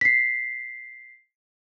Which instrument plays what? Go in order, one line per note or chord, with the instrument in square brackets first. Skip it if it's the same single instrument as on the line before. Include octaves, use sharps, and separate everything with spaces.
[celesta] B6 C7